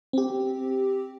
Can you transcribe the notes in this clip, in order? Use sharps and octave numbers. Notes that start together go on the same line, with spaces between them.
C4 G4